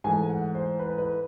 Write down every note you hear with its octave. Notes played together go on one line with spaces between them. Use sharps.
G#2 E3 A3 G#5
F#5
C5
B4
B4